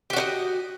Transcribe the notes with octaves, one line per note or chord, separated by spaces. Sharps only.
D4 F#4 G4 D#5